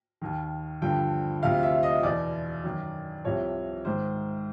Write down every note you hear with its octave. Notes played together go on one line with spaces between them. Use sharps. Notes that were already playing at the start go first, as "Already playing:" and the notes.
D#2 D#3
G2 D3 F3 G5
D2 C3 F3 F5
E5
D#5
E2 B2 D5
F#2 D#3
C2 C3 F3 C#5
G#2 D#3 C5